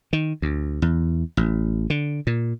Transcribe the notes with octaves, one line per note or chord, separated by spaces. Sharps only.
D#3
D2
E2
A1
D3
A#2